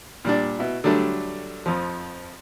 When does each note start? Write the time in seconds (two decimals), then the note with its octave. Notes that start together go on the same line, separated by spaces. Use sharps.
0.25 A#2 G3 D4
0.59 B2 E4
0.84 D3 F#3 G3 A3 D4
1.66 F2 F3